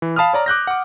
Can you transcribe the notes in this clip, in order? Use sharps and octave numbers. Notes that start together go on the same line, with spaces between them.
E3
F5 A5 B5 D#6 F6
C#5 D5 A#5
D6 F#6 G6 A#6
F#5 D6